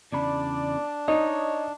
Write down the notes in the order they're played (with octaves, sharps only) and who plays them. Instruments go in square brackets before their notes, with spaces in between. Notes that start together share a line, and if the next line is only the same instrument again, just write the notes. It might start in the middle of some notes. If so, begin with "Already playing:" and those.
[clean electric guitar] E2 C#3 B5 [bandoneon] D4 [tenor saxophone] D5
[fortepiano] D#4 [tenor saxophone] C#5 [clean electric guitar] D#5